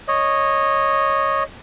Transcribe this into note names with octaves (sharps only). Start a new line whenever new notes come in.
C#5 D#5